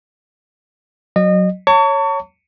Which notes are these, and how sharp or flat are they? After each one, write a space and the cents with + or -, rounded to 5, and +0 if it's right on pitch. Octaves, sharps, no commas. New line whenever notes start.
F#3 +0 D#5 -30
C#5 +0 A5 +40 C#6 +30